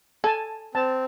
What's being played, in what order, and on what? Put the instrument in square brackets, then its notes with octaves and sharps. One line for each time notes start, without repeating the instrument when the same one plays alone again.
[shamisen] A4 [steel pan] G#5 A5
[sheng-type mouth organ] C4 [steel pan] A5